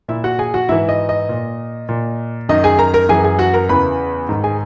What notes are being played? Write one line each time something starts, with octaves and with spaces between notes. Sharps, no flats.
A#2 E4 E5
F#4 F#5
G#4 G#5
F#4 F#5
G#2 E3 E4 E5
D#5
D#5
A#2
A#2
F#2 D#3 D#5
G#4 G#5
A#4 A#5
A#4 A#5
F#2 E3 G#4 G#5
G#4 G#5
F#4 F#5
A#4 A#5
E2 C#3 E3 B4 B5
G#2 D#3
G#4 G#5